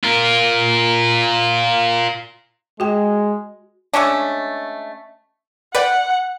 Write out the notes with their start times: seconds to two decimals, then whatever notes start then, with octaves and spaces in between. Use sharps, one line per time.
0.03 F4 A#4
2.80 G#3 F#4 G5
3.93 G#3 A3 C#4 D4
5.75 B4 D5 F#5 G5